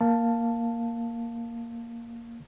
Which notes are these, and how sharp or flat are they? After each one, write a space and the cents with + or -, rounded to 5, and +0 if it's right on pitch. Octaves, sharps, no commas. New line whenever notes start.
A#3 +0 F5 +0 A5 +10